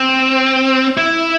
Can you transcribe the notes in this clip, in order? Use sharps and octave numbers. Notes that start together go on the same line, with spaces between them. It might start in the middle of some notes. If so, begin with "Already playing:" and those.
Already playing: C4
E4